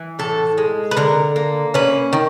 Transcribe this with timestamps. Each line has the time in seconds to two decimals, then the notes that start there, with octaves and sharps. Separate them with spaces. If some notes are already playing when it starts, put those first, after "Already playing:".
Already playing: E3
0.19 A2 A4
0.58 G#3
0.91 B4
0.97 D3 A#4
1.36 A#3
1.74 C#4 B4
2.13 D#3